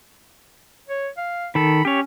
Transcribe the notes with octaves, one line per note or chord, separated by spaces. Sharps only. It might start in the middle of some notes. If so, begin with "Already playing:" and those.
C#5
F5
D#3 A4 B5
C#4 G4 C#5